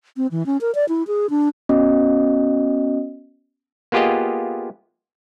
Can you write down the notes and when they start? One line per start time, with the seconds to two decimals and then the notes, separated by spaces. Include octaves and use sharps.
0.17 C4
0.31 E3
0.46 C#4
0.61 A#4
0.75 D5
0.89 E4
1.07 G#4
1.30 D4
1.69 B3 C#4 F#4 D#5
3.92 A#3 B3 F4 G4 G#4 D#5